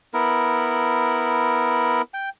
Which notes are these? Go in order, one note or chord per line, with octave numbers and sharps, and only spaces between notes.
B3 E4 A#4
G5